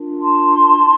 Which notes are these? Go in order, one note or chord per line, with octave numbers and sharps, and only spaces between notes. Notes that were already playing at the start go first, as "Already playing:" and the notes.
Already playing: D4 F4 A#4
A5 C6
E4